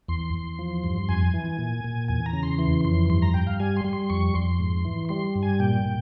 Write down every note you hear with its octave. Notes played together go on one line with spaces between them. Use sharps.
E2 C6
E2
F3
G2
F2 G#5
E3
A#2
A#2
E2 G#5
A#5
C#3
C6
E3 C6
F2 C6
G2 C6
A#5
G2 G5
F5
G3 G#5
C6
G3
C6
F2 C#6
F2 C6
G#2
E3
G3 C6
G2
G#5
A#2 G5
A#2